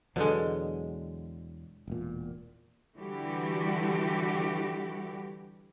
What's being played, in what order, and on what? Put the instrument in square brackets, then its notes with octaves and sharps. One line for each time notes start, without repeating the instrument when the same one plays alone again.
[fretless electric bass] E2 F#3 [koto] B2 D3 G#3
[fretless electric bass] E1 A#2
[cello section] D3 E3 G3 F#4 G4